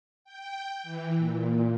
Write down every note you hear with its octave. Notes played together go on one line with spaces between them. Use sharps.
G5
E3
A#2